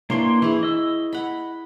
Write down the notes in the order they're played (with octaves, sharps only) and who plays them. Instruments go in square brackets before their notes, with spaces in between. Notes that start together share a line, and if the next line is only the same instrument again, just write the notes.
[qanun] E3 C#5 [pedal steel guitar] A#3 D4 C6
[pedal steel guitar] E3 [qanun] E4 G#4
[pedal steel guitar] D#5 E6
[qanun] F#5 B5